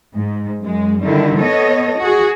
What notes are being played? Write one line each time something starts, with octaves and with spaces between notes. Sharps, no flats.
G#2
F#2 G#3
D3 D#3 G3 E4
B3 A4 C#5 D#5
F#4 G#4